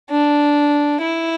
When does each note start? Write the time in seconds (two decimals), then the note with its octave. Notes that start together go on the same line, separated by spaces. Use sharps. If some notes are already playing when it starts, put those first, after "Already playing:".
0.10 D4
1.01 E4